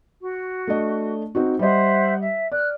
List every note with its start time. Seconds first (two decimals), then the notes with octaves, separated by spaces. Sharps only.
0.21 F#4
0.67 A3 D4 D#5
1.35 C4 D#4 F#4
1.59 G3 G4 C5 D#5 E5 F#5
2.20 E5
2.52 D5 F6 F#6